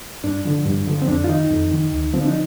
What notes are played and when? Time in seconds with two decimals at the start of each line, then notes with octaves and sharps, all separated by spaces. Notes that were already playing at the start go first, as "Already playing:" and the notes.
0.24 G2 D4
0.45 D3 F3
0.66 G2
0.87 D3 F3
1.02 C4
1.08 F2 D4
1.24 F4
1.29 D#3 D#4
1.51 F2
1.72 D#3
1.92 D2
2.14 D3 F3 C4
2.21 D4
2.28 D#4